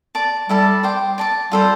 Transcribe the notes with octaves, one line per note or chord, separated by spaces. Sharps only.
D5 A5 D6
G3 E4 A4 D5 A5
C5 G5 D6
D5 A5 D6
G3 F4 A4 C5